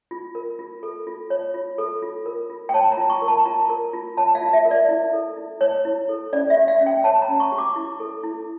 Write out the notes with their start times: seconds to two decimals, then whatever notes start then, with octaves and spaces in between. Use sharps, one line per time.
0.11 F4
0.35 A#4
0.59 F4
0.83 A4
1.07 F4
1.30 C#5
1.54 F4
1.78 A4
2.02 F4
2.26 A#4
2.50 F4
2.69 G5
2.74 C#5 A5
2.92 A#5
2.97 F4
3.10 C#6
3.22 A#4
3.28 A5
3.45 F4 A#5
3.69 A#4
3.93 F4
4.17 C#5 A5
4.35 F5
4.41 F4
4.53 E5
4.65 A#4
4.71 D5
4.89 E4
5.13 A4
5.37 E4
5.61 C#5
5.85 E4
6.09 A4
6.33 C#4 D5
6.50 E5
6.56 G4
6.68 F5
6.81 C#4
6.86 G5
7.04 C#5 A5
7.22 A#5
7.28 C#4
7.40 C#6
7.52 G4
7.58 D6
7.76 E4
8.00 A4
8.24 E4